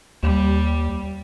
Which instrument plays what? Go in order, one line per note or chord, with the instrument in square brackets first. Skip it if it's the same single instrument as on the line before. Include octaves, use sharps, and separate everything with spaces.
[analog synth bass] D#2 [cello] G3